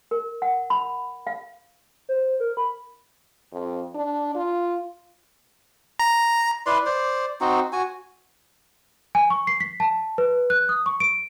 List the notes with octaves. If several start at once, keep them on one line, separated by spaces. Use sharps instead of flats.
A#4
F#5
B5
F5
C5
A#4
B5
F2
D4
F4
A#5
E4 B4 D5 C6
C5 D5
C4 D#4 F#4
F#4 G#5
G#5
C#6
C7
B6
A5
B4
F#6
D#6
C#6
D7